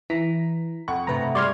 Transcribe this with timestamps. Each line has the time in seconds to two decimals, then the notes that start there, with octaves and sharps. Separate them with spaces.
0.10 E3 A#5 A#6 B6
0.88 F2 F#5 C#6
1.07 G2 C3 A3 B4 A#5
1.35 G3 G#3 D5 C6 C#6 F6 G#6 A#6